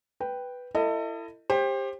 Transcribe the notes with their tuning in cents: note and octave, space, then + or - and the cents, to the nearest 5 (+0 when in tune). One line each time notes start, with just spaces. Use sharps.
B4 +0 G5 +0
E4 +25 A4 +35 D#5 +0
G4 +20 C5 +25